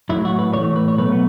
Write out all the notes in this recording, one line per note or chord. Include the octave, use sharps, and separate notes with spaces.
A2 F#3 A3 E4
F#4
B4
A2 E3 A3 C#5
B4
C#5
B2 F#3 A3 B4
B3